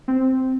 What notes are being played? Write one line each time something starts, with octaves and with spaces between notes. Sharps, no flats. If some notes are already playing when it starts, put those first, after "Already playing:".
C4